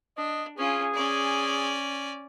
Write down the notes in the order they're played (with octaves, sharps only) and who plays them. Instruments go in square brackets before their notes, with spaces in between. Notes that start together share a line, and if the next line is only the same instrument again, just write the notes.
[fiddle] D4 [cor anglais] D#5
[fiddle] C#4 F4 [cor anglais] G#4
[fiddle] C#4 D5